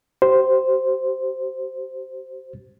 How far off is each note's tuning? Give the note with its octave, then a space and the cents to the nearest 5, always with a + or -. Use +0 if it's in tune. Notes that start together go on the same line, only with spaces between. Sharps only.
G4 -35 C5 +0